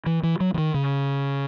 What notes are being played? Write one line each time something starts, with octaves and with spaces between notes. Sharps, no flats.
E3
E3
F#3
E3
D#3
C#3